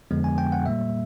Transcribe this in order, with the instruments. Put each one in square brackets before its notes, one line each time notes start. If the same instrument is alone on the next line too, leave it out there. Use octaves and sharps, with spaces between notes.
[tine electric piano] F2 D3 F3 G#3 B3
G#5
G5
F#5
A#2 G3 A#3 E5